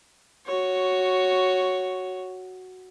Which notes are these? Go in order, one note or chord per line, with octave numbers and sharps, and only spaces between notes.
F#4 C#5